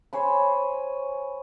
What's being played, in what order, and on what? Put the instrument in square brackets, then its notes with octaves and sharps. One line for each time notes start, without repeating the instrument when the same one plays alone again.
[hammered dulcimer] C5 C#5 G#5 B5